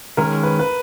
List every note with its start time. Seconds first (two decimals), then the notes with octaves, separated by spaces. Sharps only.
0.17 D#3 G#3 C#4 A#4
0.43 B4
0.59 B4